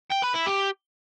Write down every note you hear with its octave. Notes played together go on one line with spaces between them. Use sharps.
G5
B4
E4
G4